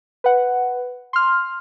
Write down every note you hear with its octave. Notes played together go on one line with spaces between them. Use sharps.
B4 F#5
C6 F6